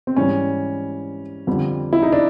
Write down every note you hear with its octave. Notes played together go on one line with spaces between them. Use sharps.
C4
G#2 E3 G3 C#4
F2 D3 G3
E4
D#4
D4